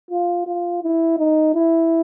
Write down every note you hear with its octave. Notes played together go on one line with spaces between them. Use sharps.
F4
F4
E4
D#4
E4